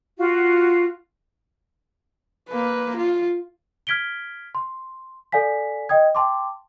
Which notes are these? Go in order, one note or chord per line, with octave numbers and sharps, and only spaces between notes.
F4 F#4
A#3 B4
F4
F6 G#6 B6 D7 G7
C6
A4 D5 F5 G#5 B6
D#5 G5 D#6 G#6
G5 A5 C6 D6